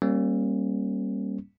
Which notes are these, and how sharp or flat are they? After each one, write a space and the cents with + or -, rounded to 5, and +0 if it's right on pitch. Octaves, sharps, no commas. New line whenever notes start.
G3 +0 A#3 +0 C#4 -35